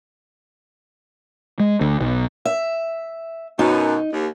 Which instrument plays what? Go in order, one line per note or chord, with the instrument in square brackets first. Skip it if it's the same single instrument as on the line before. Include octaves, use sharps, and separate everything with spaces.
[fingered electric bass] G#3
D2
B1
[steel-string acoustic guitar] E5
[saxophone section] F#2 B2 [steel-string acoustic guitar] D#4
[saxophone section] D#2